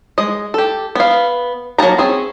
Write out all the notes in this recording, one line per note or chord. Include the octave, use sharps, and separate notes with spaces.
G#3 D#5
G4 A4
B3 F5
F#3 A#3 A5 A#5
C4 C#4 G#4